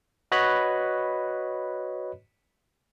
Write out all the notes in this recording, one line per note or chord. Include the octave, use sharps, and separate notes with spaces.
F#4 B4 C#5 D#5 B5 F#6